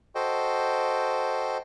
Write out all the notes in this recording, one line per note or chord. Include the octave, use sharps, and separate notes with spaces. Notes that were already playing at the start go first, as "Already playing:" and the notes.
F#4 A4 C5 D#5 G5